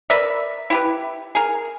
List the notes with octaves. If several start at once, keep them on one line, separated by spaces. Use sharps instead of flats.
A#4 B4 D5 E5
E4 G4 B4
G#4 A#4